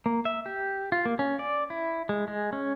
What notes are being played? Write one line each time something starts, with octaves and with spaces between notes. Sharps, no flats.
A#3
E5
G4
F4
A#3
C#4
D5
E4
G#3
G#3
C#4